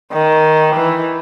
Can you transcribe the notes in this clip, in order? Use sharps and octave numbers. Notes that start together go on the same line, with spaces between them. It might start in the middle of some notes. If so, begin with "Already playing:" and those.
D#3
E3